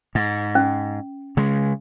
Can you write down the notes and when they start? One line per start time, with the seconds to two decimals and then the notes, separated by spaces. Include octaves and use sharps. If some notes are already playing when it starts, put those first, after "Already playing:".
0.15 G#2
0.55 C#4
1.37 C#3 G#3